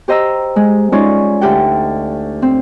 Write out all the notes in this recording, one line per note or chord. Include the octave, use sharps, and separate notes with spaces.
G4 C5 D#5 A#5 E6
G#3
G#3 C#4 D#4 F4 C#5 D5
D2 G4 F#5 G5
C4